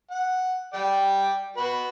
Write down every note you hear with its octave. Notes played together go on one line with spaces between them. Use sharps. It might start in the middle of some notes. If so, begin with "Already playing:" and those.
F#5
D5 G5
F#4 B4